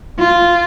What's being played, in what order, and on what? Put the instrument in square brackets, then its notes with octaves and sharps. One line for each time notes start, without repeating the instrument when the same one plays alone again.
[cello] F4